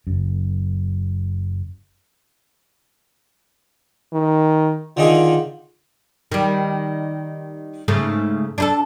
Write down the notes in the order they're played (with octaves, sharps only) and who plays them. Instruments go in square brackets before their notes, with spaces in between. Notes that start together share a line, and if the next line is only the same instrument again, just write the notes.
[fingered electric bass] F#1 F#2
[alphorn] D#3
[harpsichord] D3 D#3 G#4 [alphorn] F4
[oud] D#3 G3
G#2 C#3 A3
D4 D#4 A4